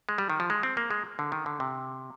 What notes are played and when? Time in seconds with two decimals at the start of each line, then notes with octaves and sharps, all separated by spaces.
0.09 G#3
0.18 G3
0.30 D#3
0.40 F3
0.50 G#3
0.63 C4
0.77 A#3
0.91 G#3
1.19 D3
1.32 D#3
1.46 D3
1.60 C3